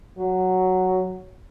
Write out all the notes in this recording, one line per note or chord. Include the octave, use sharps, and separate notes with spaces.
F#3